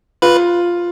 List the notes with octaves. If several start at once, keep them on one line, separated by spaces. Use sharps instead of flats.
F4 B4 B5